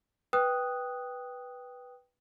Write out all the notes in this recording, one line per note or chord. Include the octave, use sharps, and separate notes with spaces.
B4 G5 D#6 F#6